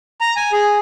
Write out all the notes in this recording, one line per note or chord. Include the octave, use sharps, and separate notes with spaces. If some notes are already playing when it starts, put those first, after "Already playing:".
A#5
G#5
G#4